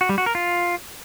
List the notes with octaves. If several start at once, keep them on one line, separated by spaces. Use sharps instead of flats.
F#4
G3
F#4
A#4
F4